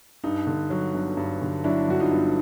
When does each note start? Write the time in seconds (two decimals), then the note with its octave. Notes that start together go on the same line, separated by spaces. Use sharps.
0.24 G2 D#4
0.47 D3
0.70 F#3
0.94 G1
1.17 G2
1.42 D3
1.64 F#3 D4 E4
1.88 G1 F#4
2.00 D#4 F4
2.11 G2